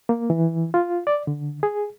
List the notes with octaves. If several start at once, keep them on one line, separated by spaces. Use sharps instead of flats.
A#3
E3
F4
D5
D3
G#4